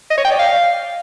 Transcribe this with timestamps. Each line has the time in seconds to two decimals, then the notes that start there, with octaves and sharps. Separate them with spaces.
0.10 D#5
0.17 C#5
0.25 G5
0.32 D5
0.39 F5